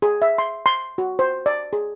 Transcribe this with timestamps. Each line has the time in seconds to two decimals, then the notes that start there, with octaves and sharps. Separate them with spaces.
0.02 G#4
0.22 E5
0.38 C6
0.66 C6
0.98 F#4
1.19 C5
1.46 D5
1.73 G#4